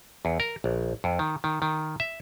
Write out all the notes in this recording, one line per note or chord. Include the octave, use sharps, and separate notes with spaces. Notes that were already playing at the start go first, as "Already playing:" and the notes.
E2
A#4
A#1
F2
D#3
D#3
D#3
E5